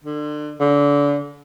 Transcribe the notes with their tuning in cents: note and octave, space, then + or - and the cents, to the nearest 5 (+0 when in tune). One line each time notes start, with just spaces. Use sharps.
D3 +30
D3 -30